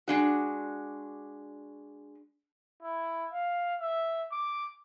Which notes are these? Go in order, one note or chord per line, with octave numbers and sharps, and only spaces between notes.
G#3 D4 F#4
E4
F5
E5
D6